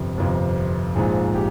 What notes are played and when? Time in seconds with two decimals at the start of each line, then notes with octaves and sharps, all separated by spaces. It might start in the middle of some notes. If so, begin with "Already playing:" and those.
Already playing: G1 F2 C3
0.17 G1 F2 C3
0.95 A#1 G#2 F3 G#4
1.34 G4